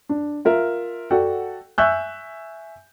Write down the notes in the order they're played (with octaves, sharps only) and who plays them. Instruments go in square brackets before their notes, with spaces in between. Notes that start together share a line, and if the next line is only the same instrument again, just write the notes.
[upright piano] D4
F4 A#4 E5
F#4 A4 D5 F#5 G5
E5 G#5 C#6 E6 F#6 G6